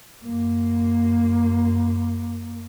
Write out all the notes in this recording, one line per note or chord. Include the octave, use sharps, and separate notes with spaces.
F#2 A#3